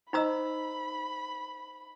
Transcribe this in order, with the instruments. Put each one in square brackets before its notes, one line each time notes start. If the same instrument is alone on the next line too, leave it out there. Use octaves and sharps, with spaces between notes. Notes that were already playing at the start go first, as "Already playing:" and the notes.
[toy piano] D#4 A#5 E6 [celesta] C5 D#5 [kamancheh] B5